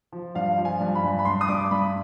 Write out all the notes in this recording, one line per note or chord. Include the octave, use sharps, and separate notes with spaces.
F3
G2 F5
F3
G#5
G2
B5
G2
B5
G2 C6
D#6
G2 D6
G2 B5